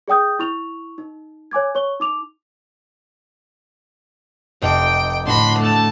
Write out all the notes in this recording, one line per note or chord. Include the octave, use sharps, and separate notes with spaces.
G#4 D5 G5 D#6 G6
E4 C#6 F7
D#4
C#5 G#5 D6 G#6
C#5 C#6 G7
D#4 D6 F7
F1 D#4 G5 D6 D7
A2 D3 D4 F#4 B5 C6 A#6
A3 A5